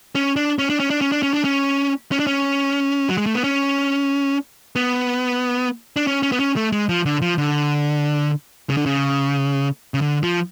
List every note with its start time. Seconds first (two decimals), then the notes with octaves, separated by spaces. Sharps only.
0.15 C#4
0.36 D4
0.59 C#4
0.70 D4
0.80 C#4
0.90 D4
1.01 C#4
1.12 D4
1.23 C#4
1.34 D4
1.44 C#4
2.12 C#4
2.19 D4
2.27 C#4
3.09 F#3
3.18 G#3
3.26 A3
3.35 B3
3.44 C#4
4.76 B3
5.96 D4
6.07 C#4
6.23 C#4
6.32 B3
6.40 C#4
6.56 A3
6.72 G#3
6.89 F3
7.06 D3
7.22 F3
7.38 D3
8.70 C#3
8.77 D3
8.86 C#3
9.94 C#3
10.02 D3
10.23 F3